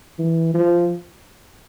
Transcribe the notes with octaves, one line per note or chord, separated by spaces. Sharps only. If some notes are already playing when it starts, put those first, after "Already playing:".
E3
F3